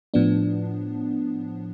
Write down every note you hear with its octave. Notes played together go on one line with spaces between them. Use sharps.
A2 F3 B3 D4